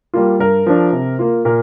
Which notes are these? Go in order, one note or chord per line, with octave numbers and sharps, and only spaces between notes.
G3 A#3 F4
G2 A#4
F3 D4
C3
A#3 F4
A#2 A#4